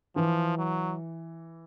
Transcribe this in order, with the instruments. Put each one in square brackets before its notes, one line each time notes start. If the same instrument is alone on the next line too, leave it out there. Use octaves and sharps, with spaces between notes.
[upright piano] E3 [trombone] F3
[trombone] F#3